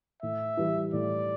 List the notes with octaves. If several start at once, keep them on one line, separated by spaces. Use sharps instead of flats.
A2 E5
E3 G3
A2 D5